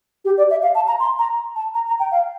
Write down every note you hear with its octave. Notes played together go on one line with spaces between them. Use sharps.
G4
D5
E5
F5
A5
A#5
C6
A#5
A5
A#5
A#5
G5
F5